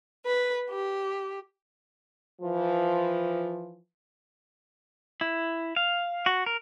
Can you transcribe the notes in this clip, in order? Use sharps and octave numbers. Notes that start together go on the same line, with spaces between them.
B4
G4
E3 F3
E4
F5
F#4
A#4